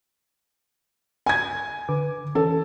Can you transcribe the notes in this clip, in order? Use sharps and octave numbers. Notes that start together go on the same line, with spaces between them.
G#5 G#6
D3 B4 D6
E3 C#4 A4